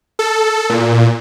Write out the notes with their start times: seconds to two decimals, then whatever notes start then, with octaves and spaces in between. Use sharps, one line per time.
0.19 A4
0.70 A#2